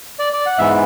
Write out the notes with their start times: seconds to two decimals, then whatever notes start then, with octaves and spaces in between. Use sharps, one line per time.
0.19 D5
0.33 D5
0.46 F#5
0.58 G#2 E3 B3 E5